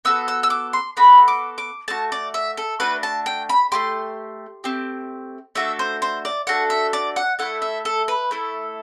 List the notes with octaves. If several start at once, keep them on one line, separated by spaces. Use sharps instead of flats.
B3 F#4 A4 E6
E6
E6
D6
C6
B3 F#4 A4 B5
D6
D6
A3 D4 F#4 A5
D5
E5
A4
A3 D4 F#4 B4
A5
G5
B5
A3 C4 G4 C6
A3 C4 G4
A3 D4 F#4 A4 E5
C5
C5
D5
A3 D4 F#4 A4 F#5
E5
D5
F#5
A3 E4 A4 F#5
E5
A4
B4
A3 E4 A4